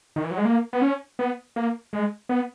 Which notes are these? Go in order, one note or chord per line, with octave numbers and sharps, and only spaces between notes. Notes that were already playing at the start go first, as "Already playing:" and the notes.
D#3
E3
F#3
G#3
A#3
B3
C#4
B3
A#3
G#3
B3